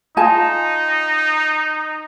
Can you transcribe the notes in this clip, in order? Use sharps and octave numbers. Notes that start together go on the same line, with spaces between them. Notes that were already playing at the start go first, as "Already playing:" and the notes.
D#4 F4 G#5 A5